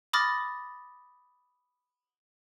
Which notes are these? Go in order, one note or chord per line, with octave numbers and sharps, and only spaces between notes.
B5 D6 D#6 F6 A6 A#6